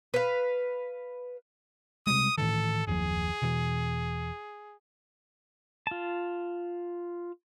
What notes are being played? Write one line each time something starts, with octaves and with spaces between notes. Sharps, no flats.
B4 F5
C3 G3 G#3 D#6
A2 D#3 E3 A4
F#1 D#2 F3 G#4
E1 B2 E3
F4 A5